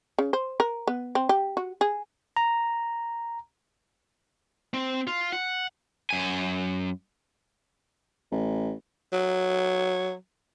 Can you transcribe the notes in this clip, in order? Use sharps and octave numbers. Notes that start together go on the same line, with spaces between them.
C#3
C5
A#4
B3
C4
G4
F#4
G#4
A#5
C4
F4
F#5
F#2 G#5
A1
F#3